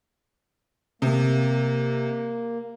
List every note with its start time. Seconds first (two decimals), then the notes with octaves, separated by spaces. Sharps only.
1.02 C3 A#3